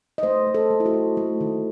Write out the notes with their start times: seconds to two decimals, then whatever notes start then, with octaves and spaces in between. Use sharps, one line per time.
0.18 D#5
0.23 A3 C5
0.47 A3
0.55 A4
0.70 A3
0.80 E4
0.86 F#4
0.94 A3
1.17 A3
1.41 D#3